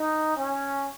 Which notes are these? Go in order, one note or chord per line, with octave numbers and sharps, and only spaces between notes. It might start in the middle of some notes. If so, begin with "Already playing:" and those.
Already playing: D#4
C#4